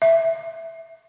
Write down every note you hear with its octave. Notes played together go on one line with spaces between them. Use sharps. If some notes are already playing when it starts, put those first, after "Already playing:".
E5